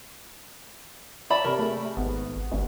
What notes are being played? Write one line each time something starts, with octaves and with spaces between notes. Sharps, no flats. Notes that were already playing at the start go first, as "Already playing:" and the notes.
C#5 D5 E5 A5 B5
C3 A#4
A3 G#4
G#1 B3
G1 D2